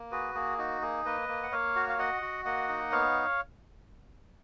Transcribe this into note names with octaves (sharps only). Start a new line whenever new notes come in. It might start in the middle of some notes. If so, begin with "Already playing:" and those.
Already playing: A#3
F#4 G#4 B4
A#3 G#4
D#4 F#4
A#3 G#4
A#3 B4 D#5
A#3
F#5
A#3 C#5 F5
F#4
F5
F#4 D#5 F#5
F#4
A#3 D#5 F#5
D#4
B3 C#5 F5